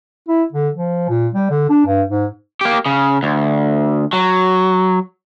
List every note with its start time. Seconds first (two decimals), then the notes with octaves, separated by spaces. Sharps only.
0.28 E4
0.53 D3
0.74 F3
1.09 A#2
1.34 G3
1.50 D3
1.69 D4
1.86 G2
2.09 G#2
2.61 A#3 G4
2.86 C#3
3.23 D2
4.13 F#3